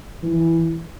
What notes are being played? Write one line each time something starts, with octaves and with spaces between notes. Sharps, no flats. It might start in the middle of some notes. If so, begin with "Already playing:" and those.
E3